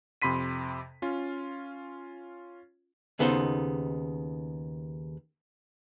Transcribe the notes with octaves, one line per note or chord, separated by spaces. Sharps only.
F2 C3 B5 C6 B6 D#7
C#4 F4
D#2 C#3 B3 D#4 A4 C5